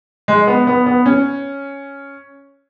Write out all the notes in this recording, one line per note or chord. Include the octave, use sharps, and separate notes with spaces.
G#3
B3
B3
B3
C#4